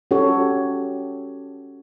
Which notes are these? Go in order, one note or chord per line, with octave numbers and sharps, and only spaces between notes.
C#4 F#4 G4 A4 C#5